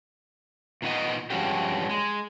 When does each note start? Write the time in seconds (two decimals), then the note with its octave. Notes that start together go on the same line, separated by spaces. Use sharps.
0.82 A#2 D#3 B3 D#5
1.30 G2 F3 G#3 C#4 F#4 G4
1.89 G#3